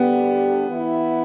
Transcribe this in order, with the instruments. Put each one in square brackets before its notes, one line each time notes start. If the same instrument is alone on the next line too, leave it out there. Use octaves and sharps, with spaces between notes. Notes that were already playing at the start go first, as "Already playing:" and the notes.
Already playing: [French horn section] D2 D3 G3 D4 G4 [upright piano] B3
[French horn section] E3 B3 E4